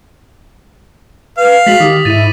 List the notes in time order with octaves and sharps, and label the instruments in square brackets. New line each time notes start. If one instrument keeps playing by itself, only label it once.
[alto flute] B4 [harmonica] F5
[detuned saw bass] G#3 [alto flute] F#4 [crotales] A6 B6 F#7
[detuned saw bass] D#3 [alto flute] G4 [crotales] D6 D#6
[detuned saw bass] G#2 [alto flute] E4 [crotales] A6 D#7